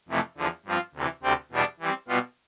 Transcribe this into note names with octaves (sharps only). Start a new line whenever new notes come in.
F2 C3 E3 A3
E2 D3 F3
G2 F3 C4 F4
D2 C3 E3
D2 C3 G3 C4 G4
E2 B2 G3 B3 D4
E3 G3 C4
B2 G3 B3 F4